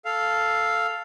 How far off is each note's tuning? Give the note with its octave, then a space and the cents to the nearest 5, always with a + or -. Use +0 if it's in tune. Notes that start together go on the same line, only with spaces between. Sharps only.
A4 +0 F5 +0